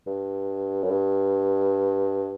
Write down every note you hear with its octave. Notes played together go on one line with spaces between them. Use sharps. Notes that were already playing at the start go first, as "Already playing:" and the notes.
G2
F#2
G2